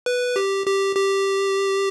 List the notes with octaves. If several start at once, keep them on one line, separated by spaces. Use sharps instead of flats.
B4
G4
G4
G4